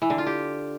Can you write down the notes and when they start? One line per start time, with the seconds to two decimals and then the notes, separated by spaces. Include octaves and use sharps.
0.02 E3
0.10 D3
0.18 F4
0.27 G4